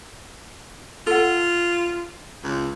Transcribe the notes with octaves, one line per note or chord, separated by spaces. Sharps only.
F4 A4 F#5
C#2